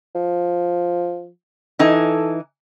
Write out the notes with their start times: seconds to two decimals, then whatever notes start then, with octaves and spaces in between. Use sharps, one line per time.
0.15 F3
1.79 E3 D#4 A4 G#5